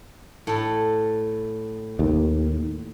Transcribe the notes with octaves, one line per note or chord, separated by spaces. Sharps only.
A2 A4
D#2